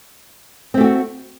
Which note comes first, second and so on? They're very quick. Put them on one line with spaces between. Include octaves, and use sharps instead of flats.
C4 A3 G4 F#4